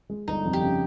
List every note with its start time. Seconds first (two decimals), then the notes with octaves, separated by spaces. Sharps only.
0.10 G#3
0.28 G1 D#4
0.45 F2
0.53 G4
0.61 C#3